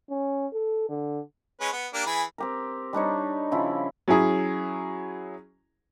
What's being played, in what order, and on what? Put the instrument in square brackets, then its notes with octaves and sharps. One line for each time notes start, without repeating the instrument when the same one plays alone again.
[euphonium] C#4
A4
D3
[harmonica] G#3 C#4 B4
B3
A#3 D4 G4
E3 G#4 B5
[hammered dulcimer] C4 G4 A#4
G3 D4 D#4 C#5
C#3 F3 E4
[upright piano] F#3 C#4 E4 G#4